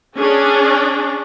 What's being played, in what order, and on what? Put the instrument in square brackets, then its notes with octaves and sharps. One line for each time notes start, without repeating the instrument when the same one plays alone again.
[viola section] C#4 D4 G#4